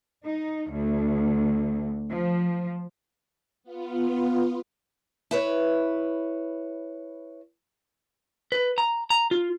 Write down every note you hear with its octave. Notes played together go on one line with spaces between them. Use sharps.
D#4
D2
F3
B3 F4
E4 B4 C#5
B4
A#5
A#5
F4